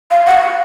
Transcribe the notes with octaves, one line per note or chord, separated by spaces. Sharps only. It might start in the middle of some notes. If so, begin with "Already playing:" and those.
F5
F#5
F5